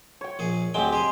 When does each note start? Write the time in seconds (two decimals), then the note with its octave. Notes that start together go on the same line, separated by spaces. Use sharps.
0.21 C#5 G5
0.39 A#1 G#4
0.74 D2 F#3 G#3 C4 G4 G5
0.92 G4 G#4 D#5